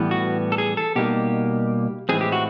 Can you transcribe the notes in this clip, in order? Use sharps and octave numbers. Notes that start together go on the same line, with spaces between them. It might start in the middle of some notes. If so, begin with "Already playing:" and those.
Already playing: A2 E3 G3 B3
F#4
A4
G#4
A4
B2 G3 A#3 D#4 G4
A2 E3 G#3 C4 G#4
G4
F#4